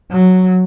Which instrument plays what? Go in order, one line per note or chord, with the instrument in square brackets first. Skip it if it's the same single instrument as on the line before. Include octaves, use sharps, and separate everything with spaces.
[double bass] F#3